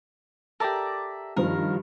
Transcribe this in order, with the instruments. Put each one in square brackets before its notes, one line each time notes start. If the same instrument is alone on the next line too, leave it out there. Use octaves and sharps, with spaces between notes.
[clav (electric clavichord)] G4 A4 [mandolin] A#4 D5 E5
[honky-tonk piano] G2 F3 [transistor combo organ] D#3 F4 [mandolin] A#4